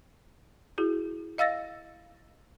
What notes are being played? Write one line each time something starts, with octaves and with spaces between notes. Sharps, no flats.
E4 F#4 G#4
D#5 F5 E6 A6 A#6